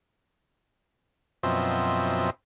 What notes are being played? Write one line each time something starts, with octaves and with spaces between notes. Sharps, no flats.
F#2 B2 F3 C4 D#5 E5